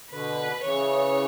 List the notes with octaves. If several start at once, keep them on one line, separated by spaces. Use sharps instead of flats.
B2 D3 B4
C#3 E3 C#5